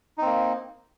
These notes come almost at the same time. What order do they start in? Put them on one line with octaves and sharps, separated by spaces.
D#4 C4 A#3